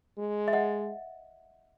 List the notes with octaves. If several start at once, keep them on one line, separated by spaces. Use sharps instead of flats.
G#3
E5
D#5 F#5